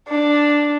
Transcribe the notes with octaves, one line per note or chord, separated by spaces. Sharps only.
D4